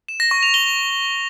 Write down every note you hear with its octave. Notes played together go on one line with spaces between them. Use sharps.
E7
A#6
C#6
F7
G7